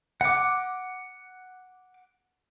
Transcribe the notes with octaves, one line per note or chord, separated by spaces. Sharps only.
F#5 D6